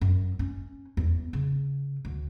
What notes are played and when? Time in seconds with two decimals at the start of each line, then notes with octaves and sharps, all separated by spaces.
0.01 F#2
0.39 C#4
0.97 E2
1.33 C#3
2.05 D2